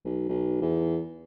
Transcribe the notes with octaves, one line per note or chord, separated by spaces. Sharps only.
B1
B1
E2